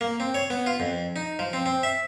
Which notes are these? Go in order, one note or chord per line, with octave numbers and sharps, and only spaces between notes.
A#3
C4
C#5
B3
F4
F2
D#4
F3
C4
C4
E5